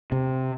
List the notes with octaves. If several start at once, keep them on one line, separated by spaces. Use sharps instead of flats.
C3